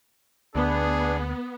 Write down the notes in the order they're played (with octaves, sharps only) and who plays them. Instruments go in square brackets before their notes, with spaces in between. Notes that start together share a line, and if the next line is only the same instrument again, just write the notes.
[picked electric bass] D2 [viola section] B3 [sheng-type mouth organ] D4 [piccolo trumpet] G#4